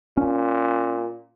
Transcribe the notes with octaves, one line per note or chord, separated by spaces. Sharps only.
A#2 C#4